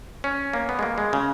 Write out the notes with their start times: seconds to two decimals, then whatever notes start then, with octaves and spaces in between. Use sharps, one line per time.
0.24 C#4
0.53 A#3
0.69 B3
0.79 G#3
0.83 A#3
0.98 G#3
1.13 C#3